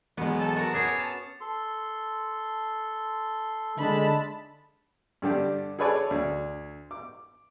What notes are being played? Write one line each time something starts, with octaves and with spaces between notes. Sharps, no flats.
E2 B2 F#3 G#3 B3
A4 A5
F#4 A#4 B4
B3 C#4 G#4 C#5 D6
A5
A4 C6
D3 G#3 D4 E5 A5 B5
G2 D3 G4 D5
G#4 A4 B4 C#5 D5 G#5
D2
D6